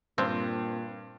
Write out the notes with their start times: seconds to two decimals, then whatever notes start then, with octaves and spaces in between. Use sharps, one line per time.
0.18 G2 A#2 C4